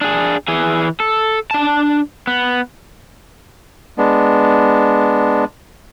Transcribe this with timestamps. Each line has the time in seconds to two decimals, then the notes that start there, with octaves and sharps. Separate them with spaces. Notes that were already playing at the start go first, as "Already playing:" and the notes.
0.01 D4 G#4
0.48 E3 G#4
1.00 A4
1.51 D4 A5
2.27 B3
3.98 G#3 B3 D4